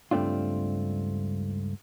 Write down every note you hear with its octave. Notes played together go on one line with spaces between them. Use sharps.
C#2 G2 A3 C4 D4 F4